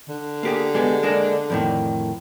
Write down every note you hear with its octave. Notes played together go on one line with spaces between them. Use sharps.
D3
A#3 G4 G#4
G#3 B3 G4
G#3 A#3 D4
F2 A2 D#3